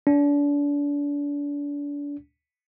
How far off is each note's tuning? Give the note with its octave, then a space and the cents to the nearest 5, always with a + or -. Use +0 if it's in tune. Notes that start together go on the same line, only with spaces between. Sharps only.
D4 -35